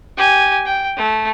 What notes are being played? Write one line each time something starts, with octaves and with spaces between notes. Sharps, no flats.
G4 G#5
G5
A3